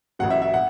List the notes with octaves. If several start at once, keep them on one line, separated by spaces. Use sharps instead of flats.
A1 A2 F#3 F#5
E5
E5
F#5